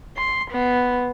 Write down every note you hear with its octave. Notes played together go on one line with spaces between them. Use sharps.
C6
B3